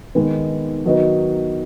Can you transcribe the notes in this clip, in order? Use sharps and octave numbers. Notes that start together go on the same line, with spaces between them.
D#3 G#3 B3
D#3 F#3 B3 D#4 B4